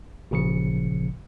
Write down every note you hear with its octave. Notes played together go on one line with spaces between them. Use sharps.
G#1 A#2 C#3 F3 C#7